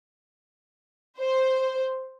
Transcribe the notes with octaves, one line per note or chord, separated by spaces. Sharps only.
C5